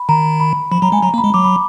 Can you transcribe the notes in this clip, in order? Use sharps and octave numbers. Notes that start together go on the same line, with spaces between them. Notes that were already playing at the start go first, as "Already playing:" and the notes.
Already playing: B5
D#3 A#5
B5
F3 B5
F#3 A#5
G#3 G#5
F#3 A#5
A#3
B5
G#3
F#3 D6
B5